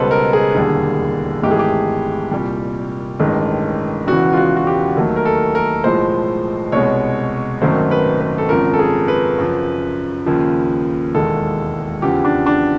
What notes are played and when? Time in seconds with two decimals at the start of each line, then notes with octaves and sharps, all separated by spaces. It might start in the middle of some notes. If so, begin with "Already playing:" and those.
Already playing: C#2 B2 G3 A4 B4 C5
0.11 A#4
0.33 G#4
0.55 E1 D#2 D3 G3
1.43 G#1 G#2 E3 A3 G4
1.51 G#4
1.59 G4
2.31 C2 A#2 G3
3.20 A1 G2 D#3 G#3
4.07 E1 E2 C#3 E3 F#4
4.33 F4
4.37 F#4
4.57 F#4
4.67 G4
4.96 D#2 D#3 F#3 A3
5.16 A#4
5.26 A4
5.55 A#4
5.84 B1 A2 F3 G#3 C5
6.72 C2 B2 G#3 C#5
7.62 G#1 F#2 D#3 F#3 A3 C5
7.91 B4
8.21 B4
8.38 A4
8.49 G#1 F#2 C#3 F3 A#4
8.73 A4
8.79 G#4
9.08 B4
9.38 F#2 C#3 F3
10.26 D#2 C#3 F3
11.15 E1 D#2 D#3 G#3 A4
12.02 E2 C#3 F3 G4
12.25 D4
12.46 D4